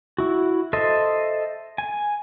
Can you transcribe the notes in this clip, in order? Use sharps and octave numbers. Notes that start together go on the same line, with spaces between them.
E4 F#4
A4 C5 D#5 E5
G#5